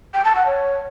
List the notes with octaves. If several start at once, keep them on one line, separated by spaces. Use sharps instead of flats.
G5
A5
F#5
C#5